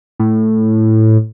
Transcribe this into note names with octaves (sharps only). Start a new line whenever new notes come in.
A2